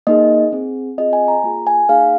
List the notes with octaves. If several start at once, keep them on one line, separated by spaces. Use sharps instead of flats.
A#3 D#4 G#4 D#5
C4 G#4
C4 F4 G#4 D#5
G#5
A#5
A#3 F4 G#4
G#5
A#3 D#4 G#4 F5